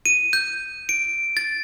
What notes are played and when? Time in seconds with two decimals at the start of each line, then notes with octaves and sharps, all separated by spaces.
0.06 D#7
0.33 G6
0.89 D7
1.37 A6